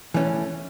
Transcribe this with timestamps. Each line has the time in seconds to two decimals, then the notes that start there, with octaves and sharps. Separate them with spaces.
0.14 E3 A3 C#4